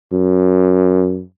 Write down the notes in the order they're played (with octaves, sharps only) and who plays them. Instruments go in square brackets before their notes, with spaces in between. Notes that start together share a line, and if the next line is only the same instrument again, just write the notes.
[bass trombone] F#2